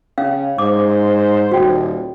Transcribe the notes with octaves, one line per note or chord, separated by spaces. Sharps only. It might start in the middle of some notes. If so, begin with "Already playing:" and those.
C#3 C#4 F5
G#2 C5 D6
D#1 F#4 G5